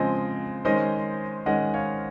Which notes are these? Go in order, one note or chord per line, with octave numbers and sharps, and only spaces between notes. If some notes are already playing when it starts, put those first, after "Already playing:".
Already playing: C#3 F3 G#3 C4 C5 D#5
D#3 G#3 C#4 C5 D#5
D#3 G#3 C#4 D#5 F#5
C#5 F5